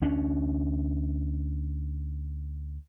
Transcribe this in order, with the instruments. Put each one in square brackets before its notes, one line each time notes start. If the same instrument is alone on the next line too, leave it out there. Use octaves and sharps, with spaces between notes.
[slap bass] D2 C#4 D4